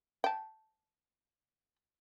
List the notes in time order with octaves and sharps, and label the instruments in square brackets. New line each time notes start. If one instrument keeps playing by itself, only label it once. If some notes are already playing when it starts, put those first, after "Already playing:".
[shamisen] G5 A5